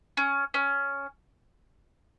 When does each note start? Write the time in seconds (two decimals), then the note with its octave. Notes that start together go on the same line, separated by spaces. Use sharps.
0.17 C#4
0.54 C#4